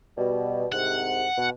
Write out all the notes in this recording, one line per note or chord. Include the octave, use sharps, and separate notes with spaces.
B2 G3
C2 G#2 C3 F#5
B2